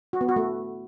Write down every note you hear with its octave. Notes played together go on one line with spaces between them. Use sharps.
F#4
B3
F#4
A3